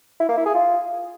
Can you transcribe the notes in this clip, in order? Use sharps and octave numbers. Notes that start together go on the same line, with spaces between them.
E4
A#3
E4
G#4
F4